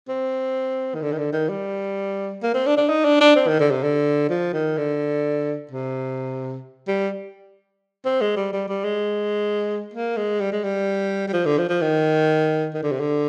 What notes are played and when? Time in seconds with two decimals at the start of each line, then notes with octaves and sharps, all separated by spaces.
0.09 C4
0.95 D#3
1.02 D3
1.12 D#3
1.18 D3
1.33 D#3
1.49 G3
2.43 A#3
2.54 C4
2.66 D4
2.77 D4
2.89 D#4
3.05 D4
3.21 D4
3.36 C4
3.48 D#3
3.60 D3
3.71 C3
3.83 D3
4.30 F3
4.53 D#3
4.78 D3
5.71 C3
6.88 G3
8.05 C4
8.21 G#3
8.36 G3
8.53 G3
8.68 G3
8.84 G#3
9.94 A#3
10.17 G#3
10.40 G3
10.52 G#3
10.64 G3
11.28 G3
11.33 F3
11.45 D3
11.58 F3
11.69 F3
11.81 D#3
12.74 D#3
12.83 D3
12.92 C3
13.00 D3